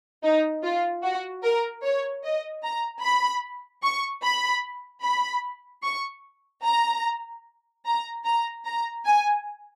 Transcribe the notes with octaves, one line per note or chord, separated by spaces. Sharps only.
D#4
F4
F#4
A#4
C#5
D#5
A#5
B5
C#6
B5
B5
C#6
A#5
A#5
A#5
A#5
G#5